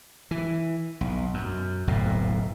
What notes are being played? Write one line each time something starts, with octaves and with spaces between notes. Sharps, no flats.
E3
B1
F#2
D1 B1 F2 A2